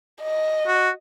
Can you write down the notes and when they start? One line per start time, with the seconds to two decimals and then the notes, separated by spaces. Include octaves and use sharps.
0.22 D#5
0.67 F#4